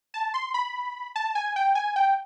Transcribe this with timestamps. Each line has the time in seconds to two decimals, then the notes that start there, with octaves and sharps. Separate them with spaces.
0.14 A5
0.34 C6
0.54 B5
1.16 A5
1.35 G#5
1.56 G5
1.75 G#5
1.96 G5